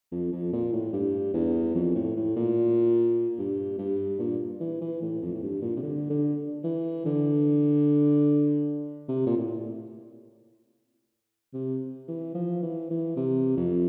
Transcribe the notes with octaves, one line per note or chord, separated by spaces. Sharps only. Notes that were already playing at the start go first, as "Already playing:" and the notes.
F2
F2
A#2
A2
G2
E2
F2
A2
A2
A#2
G2
G2
A#2
E3
E3
A2
F2
A2
G2
A#2
C3
D3
D3
E3
D3
C3
A#2
A2
C3
E3
F3
E3
E3
C3
F2